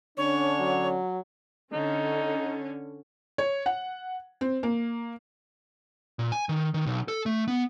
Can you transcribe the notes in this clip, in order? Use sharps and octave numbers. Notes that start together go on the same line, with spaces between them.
D3 C#4 D4 C#5
F#3
D3 C#4 D#4
C#5
F#5
C4
A#3
A#2
G#5
D#3
D#3
B1
A4
A3
B3